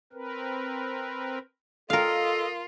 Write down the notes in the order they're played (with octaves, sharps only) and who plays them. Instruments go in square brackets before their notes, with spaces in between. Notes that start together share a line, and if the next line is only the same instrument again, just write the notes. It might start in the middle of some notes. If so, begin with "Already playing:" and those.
[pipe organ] C4 A#4 B4
[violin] F4 [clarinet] A4 [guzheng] A#4 F5 [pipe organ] D#5